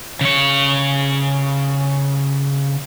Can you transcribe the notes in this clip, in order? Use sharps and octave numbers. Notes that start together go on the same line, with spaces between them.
C#3 C#5